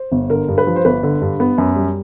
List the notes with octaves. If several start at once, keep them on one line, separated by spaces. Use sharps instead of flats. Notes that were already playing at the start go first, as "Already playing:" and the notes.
Already playing: C5
G1
D3 A#4
G2
B4
F3
C5
G1 B4
D3
G2
B3
F#2
G3